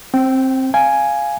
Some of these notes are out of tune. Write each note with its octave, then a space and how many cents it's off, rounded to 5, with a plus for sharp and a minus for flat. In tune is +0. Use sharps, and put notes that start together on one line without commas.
C4 +15 G5 -20
F5 -5 G#5 +0